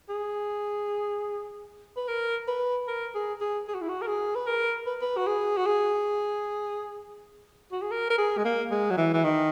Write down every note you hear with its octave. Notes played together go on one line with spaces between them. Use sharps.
G#4
B4
A#4
B4
A#4
G#4
G#4
G#4
F#4
E4
F#4
A#4
G#4
B4
A#4
B4
B4
F#4
G#4
F#4
G#4
F#4
G#4
A#4
A#4
G#4
G#3
A#3
G#3
F#3
E3
E3
D#3